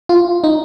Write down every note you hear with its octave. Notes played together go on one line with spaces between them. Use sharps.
F4
D#4